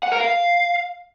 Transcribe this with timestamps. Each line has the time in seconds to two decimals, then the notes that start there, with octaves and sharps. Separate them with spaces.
0.03 F#5
0.12 A#4
0.20 F5